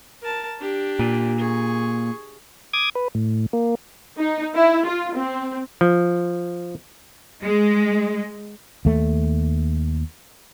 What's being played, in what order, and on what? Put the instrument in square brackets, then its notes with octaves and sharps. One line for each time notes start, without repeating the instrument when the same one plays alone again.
[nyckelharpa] A#4 A5
D4 G4
[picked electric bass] A#2
[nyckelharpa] G#4 C#6
[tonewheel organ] D6 D#6 G#6
B4
A2
A#3
[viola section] D#4
E4
F4
C4
[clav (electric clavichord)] F3
[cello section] G#3
[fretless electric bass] D#2 A3